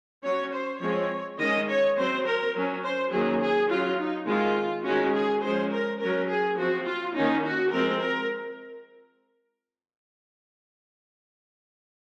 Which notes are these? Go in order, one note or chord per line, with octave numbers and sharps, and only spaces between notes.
F#3 C#4 C#5
C5
F3 G#3 C4 C#5
D#3 G#3 C#4 D#5
C#5
F#3 C4 C5
A#4
F#3 C#4
C5
D#3 F#3 A#3 C#4 G#4
G#4
F#3 C#4 F4
D#4
D#3 G#3 C4 F4
D#3 G#3 C#4 F#4
G#4
F3 G#3 C#4 C5
A#4
F#3 C#4 A#4
G#4
F3 C4 F#4
F4
D#3 A#3 C#4 D#4
F#4
F3 G#3 C4 A#4
A#4